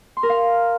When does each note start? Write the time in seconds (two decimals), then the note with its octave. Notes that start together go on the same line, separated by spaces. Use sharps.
0.17 C6
0.23 A#4
0.29 F5